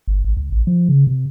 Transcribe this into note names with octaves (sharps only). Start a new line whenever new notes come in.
G1
G#1
C#2
A1
F3
C#3
C3